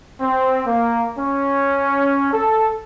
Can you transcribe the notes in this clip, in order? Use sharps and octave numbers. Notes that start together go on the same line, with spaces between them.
C4
A#3
C#4
A4